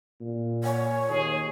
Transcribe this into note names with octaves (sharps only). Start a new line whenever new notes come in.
A#2
C#5 F#5 G#5 B5
D#2 G#4